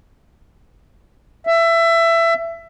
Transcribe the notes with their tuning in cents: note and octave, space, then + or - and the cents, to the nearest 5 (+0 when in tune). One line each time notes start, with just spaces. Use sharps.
E5 +20